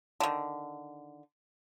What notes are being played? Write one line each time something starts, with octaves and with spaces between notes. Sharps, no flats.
D3 D#3